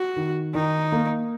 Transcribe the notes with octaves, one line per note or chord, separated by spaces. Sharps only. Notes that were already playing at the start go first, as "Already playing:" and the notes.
Already playing: F#4
D#3
D#3 D#4
A#3